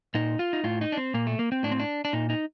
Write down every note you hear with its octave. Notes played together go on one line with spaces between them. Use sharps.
A#2 D#4
F4
D#4
A2 F4
D#4
D4
C4
A#2 A#3
A3
A#3
C4
A2 D4
C4
D4
D4
A#2 D#4
D#4